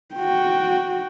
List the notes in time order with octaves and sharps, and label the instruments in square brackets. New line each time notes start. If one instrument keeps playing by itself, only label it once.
[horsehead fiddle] F#4 G5